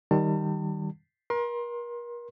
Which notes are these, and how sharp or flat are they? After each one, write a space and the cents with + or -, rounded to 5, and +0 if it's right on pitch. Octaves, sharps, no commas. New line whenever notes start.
D#3 +0 G3 -10 A5 +35
A#4 +40 C6 +25